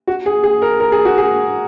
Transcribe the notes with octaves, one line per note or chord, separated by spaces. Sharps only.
F#4
G#4
G#4
A#4
A#4
G#4
F#4
G#4